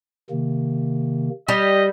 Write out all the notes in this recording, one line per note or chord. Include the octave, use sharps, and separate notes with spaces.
C3 D#3 A#3
G3 D#5